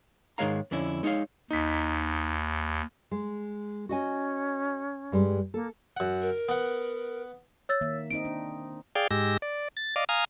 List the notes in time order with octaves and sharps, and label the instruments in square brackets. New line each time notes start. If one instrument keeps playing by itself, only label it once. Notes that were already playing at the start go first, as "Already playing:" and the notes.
[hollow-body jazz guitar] G#2 D#3 G#3 C#5 F5 A#5
F2 D3 C#4 E4
G#3 D#4 F4 C#5 F5
[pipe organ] D#2 [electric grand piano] D#4 B6
[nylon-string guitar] G#3
[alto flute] C#4 [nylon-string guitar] F#4 D#5 G#5
[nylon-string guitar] G2 G3 G#3
[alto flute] A#3 [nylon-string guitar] A4
[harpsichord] F#2 F#5
[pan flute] A#4
[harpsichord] B3 F#5
[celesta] C#5 E6 A6
[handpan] D#3 A#3 E5
[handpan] C4 D#4 D#5 [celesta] D7
[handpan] D4
[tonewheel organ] G#4 D5 F5 G5
G#2 G#3 G4 E6 A#6
D5
A6
D5 D#5 F5 D6
F5 G#5 A#5 D#6 F6